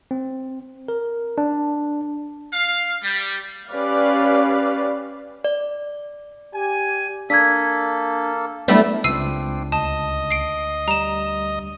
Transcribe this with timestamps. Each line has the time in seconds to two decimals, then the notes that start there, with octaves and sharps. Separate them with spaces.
0.11 C4
0.88 A#4
1.38 D4
2.52 F5
3.02 G3
3.69 C#4 G4 B4 D5 F5
5.44 D5
6.55 G4 G#5
7.30 A#3 D4 A4 G#6 B6
8.68 G3 A3 B3 D4 E4
9.04 C#2 C4 D4 E6 C7 D#7
9.72 D2 D#5 A5 D#6
10.31 C7 D7
10.88 G3 A#5 E7